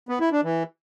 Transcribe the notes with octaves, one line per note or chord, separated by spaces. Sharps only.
B3
E4
D4
E3